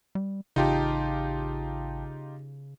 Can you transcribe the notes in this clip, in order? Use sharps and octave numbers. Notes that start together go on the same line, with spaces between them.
G3
A1 C#3 D#4 F4 G4 G5 A5